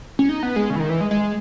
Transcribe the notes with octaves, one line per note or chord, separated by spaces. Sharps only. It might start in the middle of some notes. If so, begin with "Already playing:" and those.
C#4
D#4
B3
G#3
C#3
E3
D#3
E3
G#3
G#3